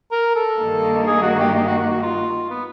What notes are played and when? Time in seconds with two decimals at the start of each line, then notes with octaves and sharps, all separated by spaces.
0.12 A#4
0.36 A4
0.59 G2 D#3 G3 A#3 D#4
1.07 G#4
1.22 F#4
1.39 G4
1.55 G4
1.67 F#4
1.79 F#4
1.90 F#4
2.02 F4
2.50 B3